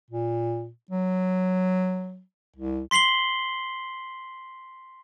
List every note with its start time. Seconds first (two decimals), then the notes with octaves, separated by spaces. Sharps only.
0.10 A#2
0.90 F#3
2.56 C2
2.91 C6 B6 C7 F#7 G7